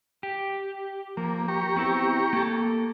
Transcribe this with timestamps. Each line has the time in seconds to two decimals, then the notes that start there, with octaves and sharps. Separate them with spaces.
0.23 G4
1.17 F3 A#3
1.48 G4 A#5 C#6
1.76 B3 C4 E4
2.33 A#3 A4